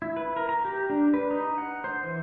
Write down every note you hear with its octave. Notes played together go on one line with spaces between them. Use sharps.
E4
B4
A#4
A#5
G4
D4
B4
D#4
F#5
C5
E3